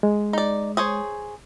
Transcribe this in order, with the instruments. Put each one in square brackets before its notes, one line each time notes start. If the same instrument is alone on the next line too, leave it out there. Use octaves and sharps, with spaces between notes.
[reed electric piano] G#3
[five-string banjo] D#4 D5
G#4 C5 C#5